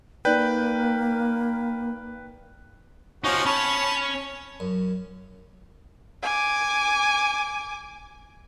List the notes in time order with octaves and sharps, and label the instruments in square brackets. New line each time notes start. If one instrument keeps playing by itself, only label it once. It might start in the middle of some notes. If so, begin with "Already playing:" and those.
[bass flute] A#3 [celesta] D#4 D5 G6 [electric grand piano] B4 G5 F#6
[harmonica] F3 C#4 F#4 [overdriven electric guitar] D#4 C#5
[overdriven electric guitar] C#4 C#5 [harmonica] A5 B5
[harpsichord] F#2
[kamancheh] G#5 D6